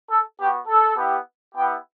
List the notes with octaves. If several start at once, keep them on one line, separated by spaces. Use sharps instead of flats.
A4
B3 F#4 G4
A4
B3 E4 G4
B3 E4 G4 G5